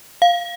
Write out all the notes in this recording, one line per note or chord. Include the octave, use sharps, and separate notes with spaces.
F5